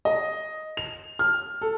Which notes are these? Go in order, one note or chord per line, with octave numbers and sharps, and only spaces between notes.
D#5
F7
F6
A4